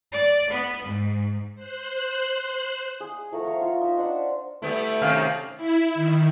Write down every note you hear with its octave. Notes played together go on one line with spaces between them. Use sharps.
D5
B3
G#2
C5 F#6
G#4
F3 A3 A#4 F#5
A#4 C#5
F4
D#4 E5
D4 C5 F#5
G3 A3 B3 E4
F#2 C3 D#3 F5
E4
D#3